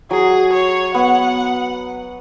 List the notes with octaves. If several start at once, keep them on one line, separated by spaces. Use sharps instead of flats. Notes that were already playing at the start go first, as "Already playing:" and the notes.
F#3 G#4
C#5
B3 F#5